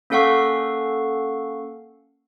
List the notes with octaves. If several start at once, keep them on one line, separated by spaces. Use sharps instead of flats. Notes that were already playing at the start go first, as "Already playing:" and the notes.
A#3 C#4 A4 F5 F#5 C#6